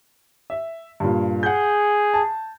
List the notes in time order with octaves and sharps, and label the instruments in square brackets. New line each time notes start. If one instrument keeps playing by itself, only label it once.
[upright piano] E5
G2 A#2
[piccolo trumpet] G#4 [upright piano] F#5 G6
[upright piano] A5